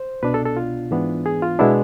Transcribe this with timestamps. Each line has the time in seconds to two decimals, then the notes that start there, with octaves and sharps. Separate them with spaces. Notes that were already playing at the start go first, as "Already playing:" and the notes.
Already playing: C5
0.22 C2 B2 B3 D4 B4
0.34 A4
0.46 A4
0.57 F4
0.91 G#2 E3 B3 D4
1.26 G#4
1.42 F4
1.59 B2 G#3 B3 D4 E4